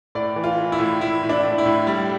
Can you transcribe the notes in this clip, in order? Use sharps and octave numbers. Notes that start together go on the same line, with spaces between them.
A2 D5
E3
F4
E3
E4
A2
A2 E4
A2
D4
A2
E4
A2
G3